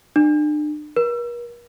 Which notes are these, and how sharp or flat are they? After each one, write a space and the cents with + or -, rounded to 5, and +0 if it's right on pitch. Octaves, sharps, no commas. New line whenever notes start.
D4 +40
A#4 +45